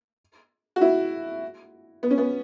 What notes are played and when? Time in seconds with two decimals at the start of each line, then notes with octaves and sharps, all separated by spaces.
0.76 F#4
0.81 E4
2.03 B3
2.11 C#4
2.18 B3